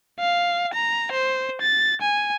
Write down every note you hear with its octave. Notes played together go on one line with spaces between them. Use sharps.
F5
A#5
C5
A6
G#5